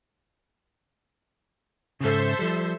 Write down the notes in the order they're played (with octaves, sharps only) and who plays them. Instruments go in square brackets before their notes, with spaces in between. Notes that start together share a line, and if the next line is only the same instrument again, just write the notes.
[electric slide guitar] G#2 C#3 [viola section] A4 C5 E5
[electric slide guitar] F3 G3